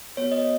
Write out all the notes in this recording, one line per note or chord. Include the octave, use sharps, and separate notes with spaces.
B3 F#4 C#5
D#5